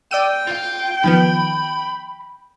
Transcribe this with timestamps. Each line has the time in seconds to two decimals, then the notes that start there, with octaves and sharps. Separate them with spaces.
0.11 D5 G5 E6 D#7
0.47 F4 F5
1.04 D#3 F3 B3 B5